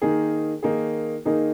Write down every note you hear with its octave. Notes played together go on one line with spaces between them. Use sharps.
D#3 A#3 D#4 G#4
D#3 A#3 D#4 G#4
D#3 A#3 D#4 G#4